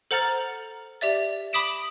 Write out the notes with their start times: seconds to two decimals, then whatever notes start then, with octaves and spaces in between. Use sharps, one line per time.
0.11 A4 C5 F#5 A#5 F6 A6
1.01 G4 D5 E5 A6
1.53 B5 D6 D#6 B6 D7 E7